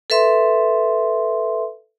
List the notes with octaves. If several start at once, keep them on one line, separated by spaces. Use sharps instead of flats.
A4 B4 E5 C6